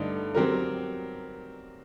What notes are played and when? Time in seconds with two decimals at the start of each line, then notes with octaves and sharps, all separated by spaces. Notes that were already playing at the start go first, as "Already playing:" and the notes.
Already playing: G2 D3 A3 D#4
0.35 F#3 C4 G4 A#4